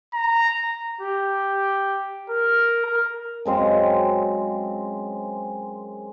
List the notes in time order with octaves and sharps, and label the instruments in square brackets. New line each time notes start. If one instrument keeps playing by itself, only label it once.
[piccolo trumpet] A#5
[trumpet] G4
A#4
A#4
[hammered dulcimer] F#2 G#3 C4 F5